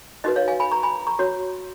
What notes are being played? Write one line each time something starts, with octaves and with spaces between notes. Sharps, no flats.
D#4 F#4 B4 D#5
C#5 F5
F5 G#5
G#5 B5
A#5 C#6
G#5 B5
A#5 C#6
C#4 F#4 C#5